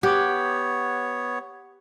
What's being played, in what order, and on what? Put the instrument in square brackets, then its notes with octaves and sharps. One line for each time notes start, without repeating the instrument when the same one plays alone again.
[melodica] B3 C#5 [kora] G4 [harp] F#5 D6 G#6